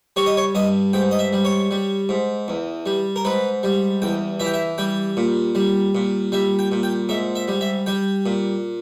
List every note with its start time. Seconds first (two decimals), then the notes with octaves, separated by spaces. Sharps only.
0.16 G3 C#5
0.26 D#5
0.37 C#5
0.55 G2 D#5
0.93 G#2 G5
1.11 D#5
1.19 E5
1.33 G3
1.45 C#5
1.71 G3
2.09 G#2
2.48 E2
2.86 G3
3.16 A#4
3.25 G#2 B4
3.63 G3
4.02 E2 G5
4.40 E3 E5
4.46 G5
4.54 E5
4.78 G3 G5
5.17 A#2
5.55 G3
5.95 A#2
6.32 G3 E5
6.59 G5
6.72 A#2
6.83 G5
7.09 G#2 E5
7.35 E5
7.48 G3
7.61 E5
7.86 G3 G5
8.26 A#2